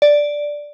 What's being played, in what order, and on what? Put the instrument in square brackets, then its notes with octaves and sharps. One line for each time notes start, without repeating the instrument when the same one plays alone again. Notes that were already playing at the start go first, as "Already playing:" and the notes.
[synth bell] D5